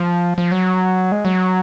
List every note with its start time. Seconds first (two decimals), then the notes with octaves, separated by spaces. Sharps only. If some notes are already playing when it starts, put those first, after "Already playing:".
Already playing: F3
0.38 F3
0.52 F#3
1.12 G#3
1.25 F#3